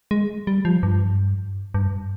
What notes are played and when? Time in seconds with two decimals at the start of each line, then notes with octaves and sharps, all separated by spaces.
0.11 G#3
0.47 G3
0.65 F3
0.83 G2
1.74 G2